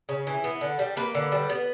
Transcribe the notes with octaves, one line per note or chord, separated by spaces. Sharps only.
C#3
E3
B3
D3
G3
A#3 B4
D3
G3
B3